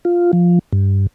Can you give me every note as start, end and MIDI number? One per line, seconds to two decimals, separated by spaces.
0.05 0.31 65
0.33 0.59 53
0.73 1.07 43